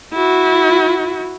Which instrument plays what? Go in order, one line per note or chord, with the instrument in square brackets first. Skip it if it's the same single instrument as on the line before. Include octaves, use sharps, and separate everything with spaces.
[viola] E4 F#4